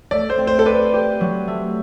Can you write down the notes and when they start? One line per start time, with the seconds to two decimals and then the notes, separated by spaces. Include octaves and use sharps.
0.11 A3 D5
0.30 C5
0.38 C4
0.47 C5
0.59 A4
0.66 B4 D5
0.94 G4
1.21 F#3
1.48 A3